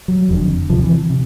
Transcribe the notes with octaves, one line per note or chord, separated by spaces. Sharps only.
F#3
F1 F2 D3
D2 C3 F3
E3
C3